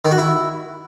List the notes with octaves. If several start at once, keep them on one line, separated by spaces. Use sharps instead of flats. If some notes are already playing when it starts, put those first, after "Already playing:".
D#3
F#4
E4